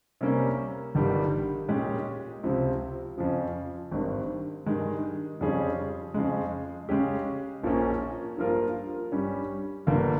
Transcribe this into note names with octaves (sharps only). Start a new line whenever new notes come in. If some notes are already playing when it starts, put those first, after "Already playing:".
C3 G3 A#3 C#4
G1 G2 D#3 G3
A#2 G#3 C#4 G4
C#2 C3 F3 C4
F2 C#3 F3
G#1 G2 D#3
G2 D#3 G#3
F2 C#3 G3 C#4 G#4
F2 C#3 G#3
C#3 G#3 C#4 G4
A#1 A#2 F3 A#3 C#4
G2 F3 A#3 F4 A#4
G2 G3 C#4
G1 G2 G3 A#3 F4